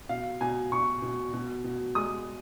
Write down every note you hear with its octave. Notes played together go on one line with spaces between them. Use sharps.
B2 F5
B2 G#5
B2 C#6
B2
B2
B2
G#3 D#6